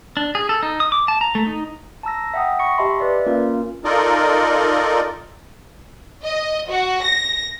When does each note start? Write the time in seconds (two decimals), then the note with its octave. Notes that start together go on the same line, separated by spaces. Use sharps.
0.17 D4
0.35 G#4
0.49 A4
0.63 D#4
0.80 D#6
0.92 D6
1.08 A5
1.21 A#5
1.35 A3
1.46 D#4
2.03 A5 A#5 E6 A#6
2.34 E5 F#5 G5 D#6
2.59 B5 C#6 A#6 C#7
2.78 G4 D#5 E5 A5 B5 C6
2.99 B4 D5 E5
3.26 A#3 C#4 F4 A#4
3.84 D#4 F4 A4 A#4 D5 D#5
6.24 D#5
6.69 F#4
7.03 A#6